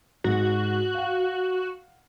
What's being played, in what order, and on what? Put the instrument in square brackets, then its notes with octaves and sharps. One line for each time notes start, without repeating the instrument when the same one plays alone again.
[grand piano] G#2 [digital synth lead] F#4
[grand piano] F5 F#5